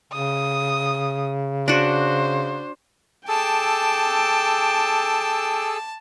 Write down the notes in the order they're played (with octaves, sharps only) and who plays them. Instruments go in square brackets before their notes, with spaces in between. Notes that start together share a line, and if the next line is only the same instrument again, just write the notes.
[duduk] C#3 [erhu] D#6
[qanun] D4 F#4 [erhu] C5
[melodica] G#4 A4 E6 [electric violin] G5 D6 [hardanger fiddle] A5